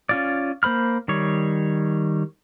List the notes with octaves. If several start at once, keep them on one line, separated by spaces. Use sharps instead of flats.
C#4 F4 D5
A#3 C5 B5 F6
D#3 G3 C#5